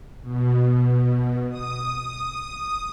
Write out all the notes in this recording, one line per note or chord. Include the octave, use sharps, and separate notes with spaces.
B2
D#6